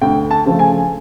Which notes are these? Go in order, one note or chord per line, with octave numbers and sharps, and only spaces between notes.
D2 G5
A5
C#3 F3 A3
G#5